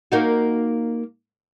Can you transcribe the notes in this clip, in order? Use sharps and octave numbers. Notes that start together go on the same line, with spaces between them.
A#3 D#4 F#4